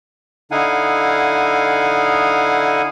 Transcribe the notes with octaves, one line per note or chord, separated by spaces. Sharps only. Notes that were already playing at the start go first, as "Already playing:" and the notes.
D3 D#4 E4 F5 F#5 G#5